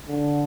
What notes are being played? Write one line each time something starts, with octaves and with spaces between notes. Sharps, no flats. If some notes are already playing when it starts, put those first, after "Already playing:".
D3